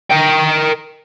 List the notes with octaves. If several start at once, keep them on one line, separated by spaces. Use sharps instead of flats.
A#4 G5